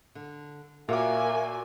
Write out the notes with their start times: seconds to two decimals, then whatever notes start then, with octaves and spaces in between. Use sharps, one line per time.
0.15 D3
0.89 A#2 A#3 F#4 A#4 C#5 E5 G#5 D6